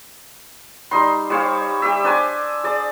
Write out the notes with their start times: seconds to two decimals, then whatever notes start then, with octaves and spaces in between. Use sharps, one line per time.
0.91 G3 D#4 C6
1.30 G3 C5 C#5 F5
1.82 G4 E5
2.04 D4 C5 G#5 D6
2.64 G#4 D5